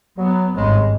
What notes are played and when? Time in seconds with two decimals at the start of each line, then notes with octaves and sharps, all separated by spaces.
0.18 F#3 B3
0.57 G#1 G2 C#3 G#3